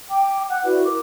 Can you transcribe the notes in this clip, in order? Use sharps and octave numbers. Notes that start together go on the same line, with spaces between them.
G5 D6
F#5 F#6
E4 F#4 B4 D5
A#4 D6